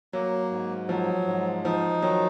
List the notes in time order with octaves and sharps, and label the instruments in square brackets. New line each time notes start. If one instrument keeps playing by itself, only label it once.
[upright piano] F#3 [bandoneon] A#3
[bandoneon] G#2
[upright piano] F3 [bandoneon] F#3
[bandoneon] G#2
[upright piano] F3 [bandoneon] D#4
[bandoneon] D#3 [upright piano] F#3